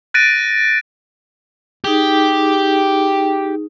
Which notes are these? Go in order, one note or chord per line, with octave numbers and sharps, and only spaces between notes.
F#6 A6 A#6 D7 D#7
D#4 G4 G#4